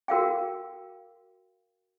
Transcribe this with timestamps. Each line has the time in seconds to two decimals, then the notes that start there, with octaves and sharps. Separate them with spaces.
0.08 F#4 A#4 F5 G5